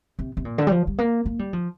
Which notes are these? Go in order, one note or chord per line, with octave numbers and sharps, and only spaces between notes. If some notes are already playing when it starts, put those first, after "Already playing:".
C3
C3
A#2
D3
G3
F3
G3
A#3
A#3
G3
F3